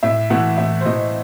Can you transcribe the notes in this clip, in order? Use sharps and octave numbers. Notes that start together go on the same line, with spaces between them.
A2 E5
E3 A3 F#5
A2 E5
C5
E3 A3 D#5